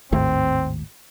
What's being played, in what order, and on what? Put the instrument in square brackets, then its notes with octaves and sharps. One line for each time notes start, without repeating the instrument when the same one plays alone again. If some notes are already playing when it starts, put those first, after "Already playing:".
[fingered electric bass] G#1 D#2 A2 [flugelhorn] C4